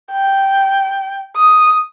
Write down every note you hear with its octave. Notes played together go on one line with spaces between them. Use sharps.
G5
D#6